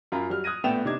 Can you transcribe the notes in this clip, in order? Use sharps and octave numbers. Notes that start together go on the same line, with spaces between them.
F#2 F4 A#5 B5
F#3 G3 F6
D#6 F#6 G#6 A#6 D#7
A#1 A3 B3 G5 E7 F7
C3 D4 D#4 D6 G#6